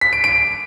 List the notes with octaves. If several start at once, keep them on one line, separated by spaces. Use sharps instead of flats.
B6
D7
D7